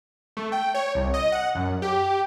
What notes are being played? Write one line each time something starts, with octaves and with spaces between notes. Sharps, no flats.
A3
G5
C#5
C2
D#5
F#5
F#2
G4